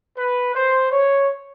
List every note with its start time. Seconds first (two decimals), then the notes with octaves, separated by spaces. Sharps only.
0.17 B4
0.55 C5
0.92 C#5